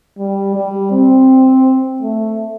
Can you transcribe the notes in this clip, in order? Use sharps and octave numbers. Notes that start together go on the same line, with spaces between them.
G3
G3
C4
A3